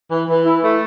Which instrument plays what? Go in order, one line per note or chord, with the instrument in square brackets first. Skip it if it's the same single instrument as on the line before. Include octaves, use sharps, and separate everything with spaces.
[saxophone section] E3
E3
E4
A3